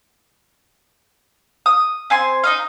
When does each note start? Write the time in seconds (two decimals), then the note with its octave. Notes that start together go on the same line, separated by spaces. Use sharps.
1.66 D#6
2.10 C4 G#5 C6
2.44 D#4 D#5 F5